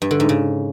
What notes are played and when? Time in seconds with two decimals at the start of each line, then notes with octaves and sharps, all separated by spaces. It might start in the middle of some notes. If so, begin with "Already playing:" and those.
0.02 G2
0.11 D3
0.20 G#2
0.29 C#3